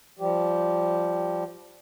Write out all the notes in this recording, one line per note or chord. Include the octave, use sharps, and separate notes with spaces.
F3 G3 G4